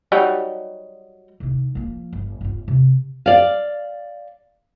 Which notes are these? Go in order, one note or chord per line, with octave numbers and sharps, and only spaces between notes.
F#3 G3 D#4
C3 D#3
F3 A#3
G1
G1 F4
C3
D5 F5